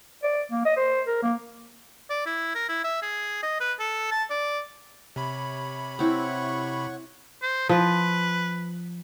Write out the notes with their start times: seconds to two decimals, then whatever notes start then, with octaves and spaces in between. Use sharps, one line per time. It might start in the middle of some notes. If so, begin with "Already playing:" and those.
0.23 D5
0.51 A#3
0.65 D#5
0.76 C5
1.07 A#4
1.23 A#3
2.10 D5
2.26 E4
2.55 A#4
2.69 E4
2.84 E5
3.02 G#4
3.43 D#5
3.61 B4
3.80 A4
4.11 A5
4.30 D5
5.16 C3 C#5 B5
5.99 C4 E4 C#5 F#5 C#6
7.42 C5
7.69 F3 B4